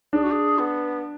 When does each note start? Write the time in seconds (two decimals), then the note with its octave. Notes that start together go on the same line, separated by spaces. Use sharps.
0.13 D4 G#4
0.22 F#4
0.31 G#4
0.58 B3